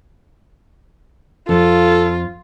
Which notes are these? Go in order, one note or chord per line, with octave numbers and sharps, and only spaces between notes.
F2 F4 A4